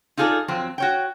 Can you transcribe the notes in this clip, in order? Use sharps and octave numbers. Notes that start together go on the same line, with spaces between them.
D#4 F4 G#4 A4 D5
F2 F#3 C4
F#4 C#5 G5